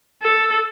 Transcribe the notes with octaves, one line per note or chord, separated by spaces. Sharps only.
A4